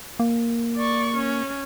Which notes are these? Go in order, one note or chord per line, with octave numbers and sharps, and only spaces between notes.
A#3
D5 C#6
C#4